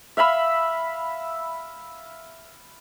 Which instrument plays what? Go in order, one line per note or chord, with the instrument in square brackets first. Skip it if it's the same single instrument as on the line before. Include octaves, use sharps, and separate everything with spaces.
[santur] E5 F5 B5 E6